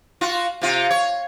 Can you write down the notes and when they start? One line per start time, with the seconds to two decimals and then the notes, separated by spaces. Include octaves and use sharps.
0.21 F4 F#4
0.61 C3 F4
0.90 C#5